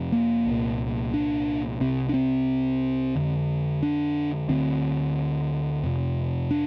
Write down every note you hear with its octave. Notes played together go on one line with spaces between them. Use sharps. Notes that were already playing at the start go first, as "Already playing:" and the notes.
Already playing: F2 C3
A#3
C2 A#2
D4
C2 C3 C4
D4
C4
F2 D3
D4
D2 D3 C4
F2 C3
D4